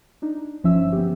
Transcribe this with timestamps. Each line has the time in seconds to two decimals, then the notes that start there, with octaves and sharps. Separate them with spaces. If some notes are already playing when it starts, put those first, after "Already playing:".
0.22 D4 D#4
0.64 G1 F3 C#4 E5 E6
0.92 B3 G4